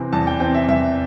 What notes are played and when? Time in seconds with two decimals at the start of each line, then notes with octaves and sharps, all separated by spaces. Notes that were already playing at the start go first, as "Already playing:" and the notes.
Already playing: C3 E3 C4
0.13 E2 A5
0.27 G5
0.40 C3 E3 C4 G5
0.54 E5
0.68 E2 E5